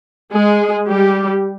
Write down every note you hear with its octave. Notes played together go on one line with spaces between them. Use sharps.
G#3 G#4
G3 G4